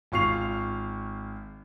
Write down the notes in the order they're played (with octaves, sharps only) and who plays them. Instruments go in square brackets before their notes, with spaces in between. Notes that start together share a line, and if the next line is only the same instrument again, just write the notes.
[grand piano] G#1 F4 C#6 C7 F7